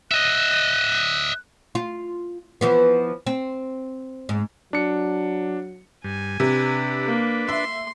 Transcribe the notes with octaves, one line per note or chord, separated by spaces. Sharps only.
D#5 E5 F#6
F4
E3 F3 B3
C4
G#2
F#3 D4 C#7
G2 G#5
C3 D4 B4
A#3
E5 C6